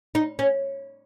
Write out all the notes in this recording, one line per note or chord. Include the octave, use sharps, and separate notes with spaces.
D#4
C#4